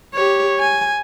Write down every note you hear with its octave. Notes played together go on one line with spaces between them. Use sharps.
G4 C#5
G#5